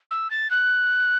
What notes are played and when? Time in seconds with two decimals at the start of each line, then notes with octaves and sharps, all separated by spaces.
0.11 E6
0.31 A6
0.51 F#6